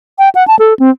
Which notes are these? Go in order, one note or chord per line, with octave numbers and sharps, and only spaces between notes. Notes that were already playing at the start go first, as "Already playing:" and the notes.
G5
F#5
A5
A4
C4